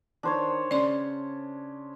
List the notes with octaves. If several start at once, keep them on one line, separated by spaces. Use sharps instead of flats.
D#3 D4 C5 C#5
C#3 D5 C6